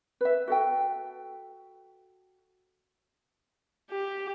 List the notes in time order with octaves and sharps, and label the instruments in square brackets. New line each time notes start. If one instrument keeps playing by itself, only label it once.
[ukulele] B4 E5
F#4 A4 G5
[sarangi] G4